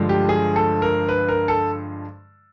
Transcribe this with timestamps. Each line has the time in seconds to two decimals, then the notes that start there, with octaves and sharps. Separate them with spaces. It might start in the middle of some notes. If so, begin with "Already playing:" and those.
Already playing: G2 D3 F3 G#3
0.09 G4
0.29 G#4
0.56 A4
0.82 A#4
1.09 B4
1.29 A#4
1.48 A4